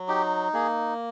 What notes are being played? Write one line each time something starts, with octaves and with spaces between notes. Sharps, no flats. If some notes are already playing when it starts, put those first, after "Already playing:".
Already playing: F#3
D#4 G4
A#3 G#4